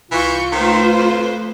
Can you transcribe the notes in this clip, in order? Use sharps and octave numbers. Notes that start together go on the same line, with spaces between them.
C2 E3 F4 C#6 G6
D#3 A3 B4 C5
F2